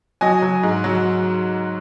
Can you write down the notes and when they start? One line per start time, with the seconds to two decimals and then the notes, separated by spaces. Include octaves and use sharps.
0.21 F#3 D#5 G#5
0.42 F#3
0.63 G#2
0.84 F#3